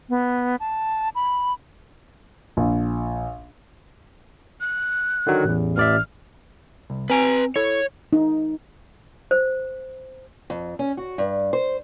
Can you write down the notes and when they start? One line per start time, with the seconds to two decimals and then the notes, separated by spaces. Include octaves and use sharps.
0.09 B3
0.60 A5
1.15 B5
2.57 A#1
4.61 F#6
5.27 D3 D#3 F#3
5.44 A1 E2
5.77 A1 D5 E5 F6
6.90 C2
7.10 C4 B4 G#5 A#5
7.56 E4 A4 C#5
8.13 D#4
9.31 C5
10.50 F2
10.79 C#4
10.97 F#4
11.18 G2
11.53 C5